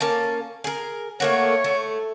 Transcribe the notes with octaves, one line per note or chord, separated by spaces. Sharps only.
A#3 C#4 A5
G#4 A#4
A3 A#3 F#4 C#5
A3